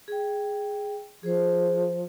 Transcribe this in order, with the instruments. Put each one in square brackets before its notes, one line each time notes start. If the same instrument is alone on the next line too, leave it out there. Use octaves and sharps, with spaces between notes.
[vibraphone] G#4 G5
[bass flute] F3 [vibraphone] G#4 C5